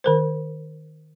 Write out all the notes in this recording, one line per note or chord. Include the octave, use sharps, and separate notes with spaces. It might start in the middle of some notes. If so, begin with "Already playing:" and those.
D#3 A#4 C5